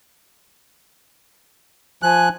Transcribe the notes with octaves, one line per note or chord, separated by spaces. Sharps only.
F3 G#5 F#6